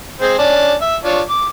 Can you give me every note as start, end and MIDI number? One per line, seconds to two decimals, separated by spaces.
0.21 0.37 56
0.21 0.37 60
0.21 0.37 72
0.39 0.74 61
0.39 0.74 62
0.39 0.74 74
0.81 0.96 76
0.81 0.96 88
1.04 1.21 62
1.04 1.21 65
1.04 1.21 73
1.29 1.47 86